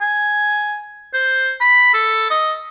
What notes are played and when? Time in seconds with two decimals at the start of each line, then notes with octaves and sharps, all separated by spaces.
0.01 G#5
1.14 C5
1.61 B5
1.94 A4
2.30 D#5